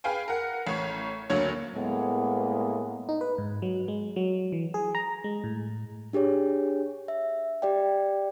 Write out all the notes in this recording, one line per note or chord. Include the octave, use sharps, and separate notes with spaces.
G#4 B4 F5 G5 G#5
A#4 F#5
A1 C#5 C#6
F#1 D2 F#3 A#3 C#5
A2 G#3 A#3 B3
D#4
B4
G#2
F#3
G#3
F#3
E3
G#4
A#5
G#3
A2
D4 G4 G#4 C#5
E5
G4 D5 G5